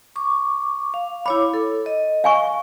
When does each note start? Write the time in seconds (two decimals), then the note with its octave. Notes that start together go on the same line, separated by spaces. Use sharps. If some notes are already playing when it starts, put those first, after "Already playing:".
0.16 C#6 D6
0.94 F5
1.26 E4 C#5 B5 D6
1.54 A4
1.86 D#5
2.24 F5 G#5 C#6